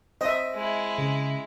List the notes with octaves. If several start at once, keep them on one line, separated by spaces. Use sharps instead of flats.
C4 D#5 E5
G#3 E4
C#3